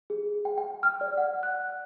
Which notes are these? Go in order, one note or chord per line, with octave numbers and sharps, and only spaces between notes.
G#4
G5
G5
F6
D5
F#5
F#6